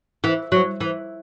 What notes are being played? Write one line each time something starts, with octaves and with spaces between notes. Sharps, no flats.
E3
F#3
E3